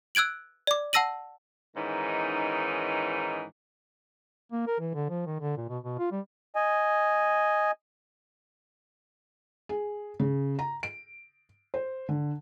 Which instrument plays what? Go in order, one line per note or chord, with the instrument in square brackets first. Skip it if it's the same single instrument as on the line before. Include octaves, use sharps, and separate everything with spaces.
[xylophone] E6 F#6 G#6 D7 F#7
D5 D6
F#5 A5 E6 A#6 D#7 F#7
[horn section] G#2 D#3 E3 C#4 D#4
[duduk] A#3
A#4
E3
D3
F3
D#3
D3
A#2
B2
B2
F4
G3
[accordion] D#5 G#5
[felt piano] G#4
C#3
A#5
D7
C5
D3